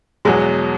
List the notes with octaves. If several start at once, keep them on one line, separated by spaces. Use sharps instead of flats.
E2 B2 F#3 G#3